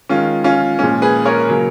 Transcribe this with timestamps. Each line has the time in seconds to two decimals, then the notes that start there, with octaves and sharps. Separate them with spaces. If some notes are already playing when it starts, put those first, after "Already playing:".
0.09 D#3 G#3 C#4 F4
0.44 C#4 F4
0.79 A#2 F3 G#3 C#4
1.02 G#4 B4
1.25 A#4 C#5
1.48 C#3 F#3 A#3